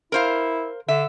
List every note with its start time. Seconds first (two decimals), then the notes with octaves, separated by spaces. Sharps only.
0.12 E4 A#4 C5 F5
0.88 D3 E5